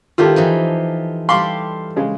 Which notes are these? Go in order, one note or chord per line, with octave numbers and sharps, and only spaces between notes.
D#3 E4 F4 G4 A4 C5
E3 F3 D#4
G3 A4 F5 B5 C6 D6
C#3 G#3